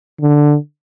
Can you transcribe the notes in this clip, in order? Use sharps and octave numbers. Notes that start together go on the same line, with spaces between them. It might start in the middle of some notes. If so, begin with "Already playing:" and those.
D3